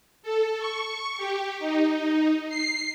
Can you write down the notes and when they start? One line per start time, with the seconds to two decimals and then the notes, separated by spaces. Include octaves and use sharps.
0.23 A4
0.59 C#6
1.17 G4
1.59 D#4
2.49 C7